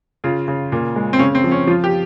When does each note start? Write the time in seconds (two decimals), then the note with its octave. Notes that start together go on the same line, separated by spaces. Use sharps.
0.24 C#3 F4
0.48 C#3
0.72 A#2
0.96 G#3
1.13 C4
1.19 C#3 C#4
1.35 C4
1.44 F3
1.52 C#4
1.67 F3 F4
1.84 G4